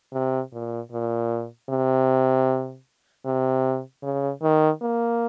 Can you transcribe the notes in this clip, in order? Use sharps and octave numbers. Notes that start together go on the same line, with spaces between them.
C3
A#2
A#2
C3
C3
C#3
D#3
A#3